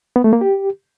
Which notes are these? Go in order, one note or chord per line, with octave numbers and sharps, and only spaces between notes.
B3
A3
A#3
G4